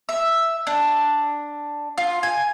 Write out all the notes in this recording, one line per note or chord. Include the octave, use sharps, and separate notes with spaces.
E5
D4
F4
G#5